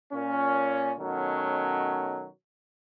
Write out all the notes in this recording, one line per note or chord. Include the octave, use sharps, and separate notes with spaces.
A#2 C#4
B2 D#3 F#3 A3 C#4